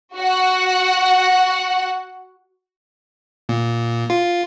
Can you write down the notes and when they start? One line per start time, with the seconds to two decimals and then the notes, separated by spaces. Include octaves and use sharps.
0.16 F#4 F#5
3.49 A#2
4.10 F4